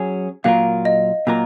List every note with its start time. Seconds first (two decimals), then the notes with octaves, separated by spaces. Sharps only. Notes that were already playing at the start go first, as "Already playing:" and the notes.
Already playing: F#3 C#4 G#4
0.44 A#2 F#3 A#3 F4 A#4 F5
0.85 D#5
1.27 A#2 F#3 A#3 F4 A#4